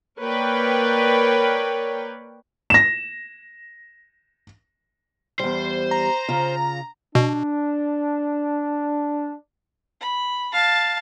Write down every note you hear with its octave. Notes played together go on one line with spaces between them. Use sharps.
A#3 A#4 B4 C#5 D5 G5
A#6 E7
E2 G3 C5
A#5
C#3 F4
B2 D4
B5
F5 A5